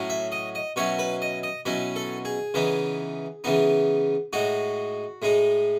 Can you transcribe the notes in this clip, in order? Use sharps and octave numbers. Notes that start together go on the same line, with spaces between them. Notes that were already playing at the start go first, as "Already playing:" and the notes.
Already playing: A2 F#3 C#4
E5
D#5
D#5
B2 F#3 C#4 E4 C#5
B4
D#5
D#5
B2 F#3 C#4 E4
A4
G#4
C#3 E3 B3 D#4
C#3 E3 B3 D#4
A2 G#3 D#4 F#4
A2 G#3 D#4